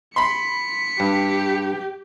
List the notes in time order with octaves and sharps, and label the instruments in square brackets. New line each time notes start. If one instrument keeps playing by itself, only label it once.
[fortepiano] B5 C6 [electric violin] B6 C#7
[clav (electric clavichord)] G2 [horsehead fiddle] G4